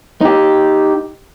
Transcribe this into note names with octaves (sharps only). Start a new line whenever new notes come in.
D#4 G4